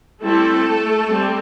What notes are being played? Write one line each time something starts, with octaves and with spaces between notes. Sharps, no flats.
G3 A3 C4 E4 A4
G3 C4